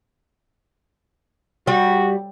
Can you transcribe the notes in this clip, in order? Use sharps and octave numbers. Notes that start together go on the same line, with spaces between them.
G3 F#4